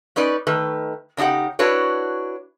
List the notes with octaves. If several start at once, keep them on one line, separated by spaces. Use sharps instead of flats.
C#4 D#4 B4 D5
D#3 A3 B4
C#3 D4 D#4 G4 F#5
D4 E4 F#4 B4 C#5